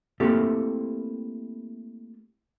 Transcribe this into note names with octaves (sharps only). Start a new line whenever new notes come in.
A3 A#3 C4 E4 G4 A4